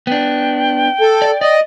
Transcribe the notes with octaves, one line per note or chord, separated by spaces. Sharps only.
B3 D4 G5
A4
D5
D5 D#5